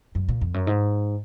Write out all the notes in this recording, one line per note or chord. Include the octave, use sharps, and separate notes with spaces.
F#2
A#2
F2
F#2
G#2